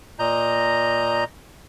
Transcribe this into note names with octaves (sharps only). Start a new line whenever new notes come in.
A#2 D#5 A#5 G6